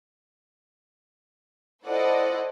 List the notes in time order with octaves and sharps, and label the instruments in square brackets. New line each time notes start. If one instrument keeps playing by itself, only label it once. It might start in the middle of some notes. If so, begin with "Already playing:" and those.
[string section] E4 A4 C5 D5 D#5 F#5